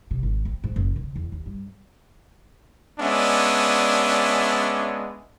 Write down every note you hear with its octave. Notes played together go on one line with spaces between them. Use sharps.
C3
G#1
C4
G#2
F#1
C#3
E2
D#2
G2
G#3 B3 C#4 D4 D5 E5